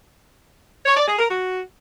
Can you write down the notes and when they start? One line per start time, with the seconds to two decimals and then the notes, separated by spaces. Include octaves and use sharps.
0.86 C#5
0.97 D5
1.07 G#4
1.18 A#4
1.29 F#4